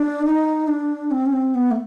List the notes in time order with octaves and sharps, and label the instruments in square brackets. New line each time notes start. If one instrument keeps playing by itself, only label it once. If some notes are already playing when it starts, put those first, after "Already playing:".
Already playing: [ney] D4
D#4
D4
C4
C#4
C4
B3
A3